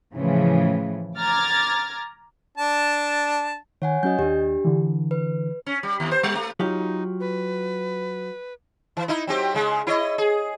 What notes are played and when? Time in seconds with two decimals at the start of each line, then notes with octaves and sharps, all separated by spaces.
0.15 A2 C#3 E3 F3
1.18 A#5 D6 F6 G#6 A6
2.58 D4 A5
3.82 D#3 C#5 F#5 G#5
4.03 F#3 C#4 F#4 D#5 G6
4.19 D#2 D4 G4
4.65 D3 E3
5.11 B4
5.66 C#4
5.83 G3
6.00 D#2
6.11 C5
6.23 G3
6.35 A3
6.60 F#3 D#4 F4 G4
7.20 B4
8.97 E3
9.08 D#4 E4
9.27 F#3 C4 G4
9.55 C#3 G#3
9.87 E4 C#5 D#5
10.18 G#4